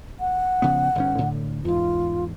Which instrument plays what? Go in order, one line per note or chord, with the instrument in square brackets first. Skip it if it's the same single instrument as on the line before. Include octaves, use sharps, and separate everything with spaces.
[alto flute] F#5
[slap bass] C#3 F3 B3
G1 G#2 C#4
A2 D3
[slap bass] E2 G#2 [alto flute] F4